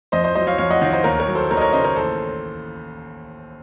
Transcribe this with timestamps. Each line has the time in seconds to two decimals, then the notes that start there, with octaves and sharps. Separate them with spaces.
0.12 F2 C5 D#5
0.24 C5 D#5
0.35 F#3 C5 D#5
0.47 C#5 F5
0.58 F2 C#5 F5
0.70 D#5 F#5
0.81 D#3 C#5 F5
0.93 C5 D#5
1.04 D#2 A#4 C#5
1.20 A#4 C#5
1.28 F#3
1.35 A4 C5
1.50 D#2 A#4 C#5
1.57 D#5
1.62 A#4 C#5
1.73 C#3 C5 D#5
1.85 A#4 C#5
1.96 A1 A4 C5